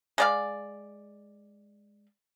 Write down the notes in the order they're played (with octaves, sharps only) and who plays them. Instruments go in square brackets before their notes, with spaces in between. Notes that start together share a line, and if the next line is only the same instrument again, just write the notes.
[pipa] G#3 D5 F5